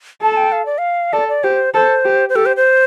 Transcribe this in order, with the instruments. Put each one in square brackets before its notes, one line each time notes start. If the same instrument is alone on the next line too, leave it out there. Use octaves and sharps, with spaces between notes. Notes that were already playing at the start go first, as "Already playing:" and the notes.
[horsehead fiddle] A4 [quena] A5
[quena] G5
F5
D5
F5
[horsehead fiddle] A4 [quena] D5
[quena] D5
[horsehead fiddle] G4 [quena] C5
[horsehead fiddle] A4 [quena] C5
[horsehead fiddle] G4
[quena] C5
[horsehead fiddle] G4 [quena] A4
[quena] C5
C5